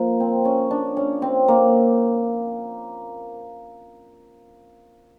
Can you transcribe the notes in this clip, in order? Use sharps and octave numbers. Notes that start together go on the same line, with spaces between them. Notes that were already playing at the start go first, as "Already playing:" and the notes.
Already playing: F3 A#3
C4
C#4
D4
C#4
C4
A#3